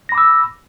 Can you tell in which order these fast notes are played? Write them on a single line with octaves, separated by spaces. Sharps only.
A#6 B5 D6 E6